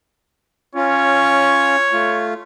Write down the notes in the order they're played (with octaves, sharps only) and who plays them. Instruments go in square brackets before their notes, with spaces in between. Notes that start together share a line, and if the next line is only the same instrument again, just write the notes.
[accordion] C#4 F4 [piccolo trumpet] C#5
[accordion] A3 F4